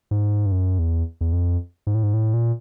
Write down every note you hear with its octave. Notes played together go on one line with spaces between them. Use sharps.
G#2
G2
F#2
E2
E2
F2
G#2
A2
G#2
A2
A#2